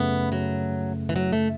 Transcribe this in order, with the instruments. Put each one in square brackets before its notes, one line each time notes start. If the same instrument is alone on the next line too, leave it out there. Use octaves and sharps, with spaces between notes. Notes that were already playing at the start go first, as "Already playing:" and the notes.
Already playing: [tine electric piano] F#2 C#3 A3 [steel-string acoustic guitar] B3
[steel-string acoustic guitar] F#3
E3
F#3
A3